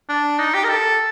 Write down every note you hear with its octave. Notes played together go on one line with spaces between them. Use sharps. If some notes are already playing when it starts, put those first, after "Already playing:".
D4
D#4
G4
A#4
A4